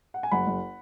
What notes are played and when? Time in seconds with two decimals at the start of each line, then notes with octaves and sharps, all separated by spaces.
0.14 F#5
0.23 G#5
0.31 F#1 F#5 B5
0.47 F#1